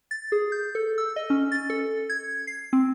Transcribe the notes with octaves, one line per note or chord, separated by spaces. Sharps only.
A6
G#4
G6
A4
E6
D#5
C#4
A6
A4
G#6
C7
C4